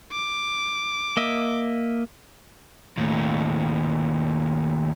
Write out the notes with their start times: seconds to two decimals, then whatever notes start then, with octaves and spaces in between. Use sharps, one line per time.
0.13 D6
1.17 A#3 D#5 E5
2.97 D#2 A2